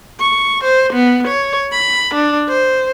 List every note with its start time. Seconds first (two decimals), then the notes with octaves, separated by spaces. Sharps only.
0.20 C#6
0.64 C5
0.93 B3
1.28 C#5
1.72 B5
2.15 D4
2.49 C5